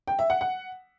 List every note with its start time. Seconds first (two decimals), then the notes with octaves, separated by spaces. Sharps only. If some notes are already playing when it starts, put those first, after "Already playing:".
0.08 G5
0.19 E5
0.30 F#5
0.41 F#5